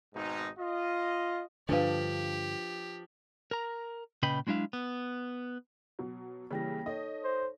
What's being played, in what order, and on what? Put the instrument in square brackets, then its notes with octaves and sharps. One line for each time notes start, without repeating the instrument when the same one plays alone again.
[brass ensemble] G#1 G#2 B2 G#3 D#4
F4 D#5
[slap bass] G2 D3 [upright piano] F3 [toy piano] D4 B4 F5 [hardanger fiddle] G4
[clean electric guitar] A#4 A#5
A#2 C#3 B4 D#5 G5 B5
F#3 G#3 D4 E4 F5
B3
[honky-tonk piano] B2 F#3
[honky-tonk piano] C#3 E3 G3 [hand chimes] A#3 G5 A#6
[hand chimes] D#4 A4 C#5 [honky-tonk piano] D#5
[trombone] C5